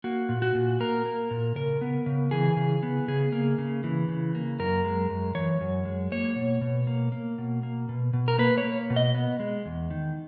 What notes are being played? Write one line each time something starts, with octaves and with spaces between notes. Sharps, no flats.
A#3 F#4
A#2
F#4
A#2
A#3 A#4
A#3
A#2
C#3 A#4
B3
C#3
E3 G#4
C#3
B3
C#3 G#4
A#3
C#3
E3
C#3
A#3
F#2 A#4
G#3
F#2
E3 C#5
F#2
G#3
A#3 C#5
B2
B2
A#3
A#3
B2
A#3
B2
B2
A#4
A#3 B4
C#5
A#3
B2
D#5
B3
G#3
E2
D#3